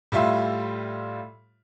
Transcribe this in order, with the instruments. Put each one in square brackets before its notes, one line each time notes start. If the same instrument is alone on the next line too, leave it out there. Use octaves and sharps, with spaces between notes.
[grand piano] A2 G3 F4 E5 C6 E6